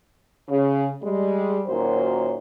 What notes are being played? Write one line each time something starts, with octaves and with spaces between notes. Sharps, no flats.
C#3
G3 G#3
F#2 A#2 D#3 F#3 C5